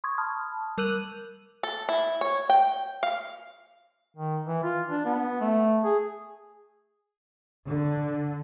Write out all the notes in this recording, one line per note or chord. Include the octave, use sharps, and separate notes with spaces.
C6 C#6 D#6 G#6
A5 B5 D#6 F6
G3 A#4 E6 F#6 D#7 F#7
A4
E4
C#5
G5
F5
D#3
E3
F4
D4
B3
A3
G#4
D3